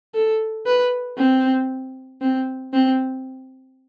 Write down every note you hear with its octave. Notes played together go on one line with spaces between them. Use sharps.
A4
B4
C4
C4
C4